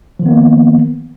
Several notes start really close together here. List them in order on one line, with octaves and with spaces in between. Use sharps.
F3 D#3 B3 A#3